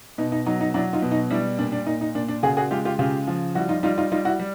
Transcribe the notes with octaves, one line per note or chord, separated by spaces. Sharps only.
B2 D#4
D#4
F#3 D#4
D#4
F#3 D4 E4
D#4 F4
B2
D#4
G3 D4 E4
A#2 D4
D4
A#2 D#4
D#4
A#2 D4
D4
C#3 F#4 G#4
F#4 G#4
G#3 F4 G4
F4 G4
C#3 F4 G4
F3
G3 E4 F#4
D#4 F4
G3 D#4 F4
D#4 F4
G3 D#4 F4
E4 F#4
G3